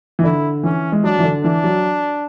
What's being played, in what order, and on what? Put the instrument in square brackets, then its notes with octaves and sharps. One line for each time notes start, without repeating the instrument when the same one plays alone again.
[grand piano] E3
[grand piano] D3 [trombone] E4
[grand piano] E3 [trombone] C#4
[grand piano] G#3
[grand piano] F#3 [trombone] D4
[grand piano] E3
D3
[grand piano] E3 [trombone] D4
[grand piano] F#3